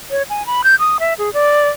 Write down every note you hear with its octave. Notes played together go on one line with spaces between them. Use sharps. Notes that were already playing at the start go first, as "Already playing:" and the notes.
C#5
G#5
B5
G6
D#6
E5
G#4
D5